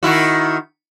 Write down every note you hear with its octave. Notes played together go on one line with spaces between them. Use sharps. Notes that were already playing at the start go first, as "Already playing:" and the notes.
D#3 E4 F#4